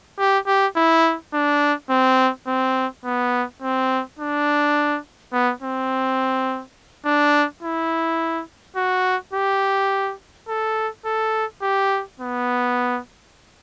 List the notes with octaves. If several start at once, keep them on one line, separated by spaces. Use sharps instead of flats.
G4
G4
E4
D4
C4
C4
B3
C4
D4
B3
C4
D4
E4
F#4
G4
A4
A4
G4
B3